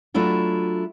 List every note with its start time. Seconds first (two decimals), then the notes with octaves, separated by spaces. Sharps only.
0.14 F#3 A3 D4 E4 F4